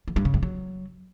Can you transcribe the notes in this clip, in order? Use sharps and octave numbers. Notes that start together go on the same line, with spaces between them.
E3
G2
C#3
G2
F#3